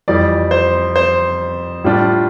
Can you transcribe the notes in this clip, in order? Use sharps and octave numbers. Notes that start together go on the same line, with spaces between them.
F2 E3 G3 D5
C5
C5
A2 G3 D4 F4